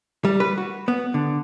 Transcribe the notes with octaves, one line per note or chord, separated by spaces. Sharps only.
G3
B4
F#4
B3
D3